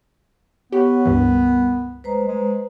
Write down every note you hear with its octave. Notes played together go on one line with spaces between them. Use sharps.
B3 G4 C#5 F#5 C#6
C#2 G2 E3 G3 A#4
G#3 B4 C5 A#5
G#3